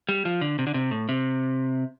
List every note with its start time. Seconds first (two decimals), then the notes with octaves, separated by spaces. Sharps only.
0.09 G3
0.25 F3
0.41 D3
0.59 C3
0.67 D3
0.74 C3
0.91 A2
1.09 C3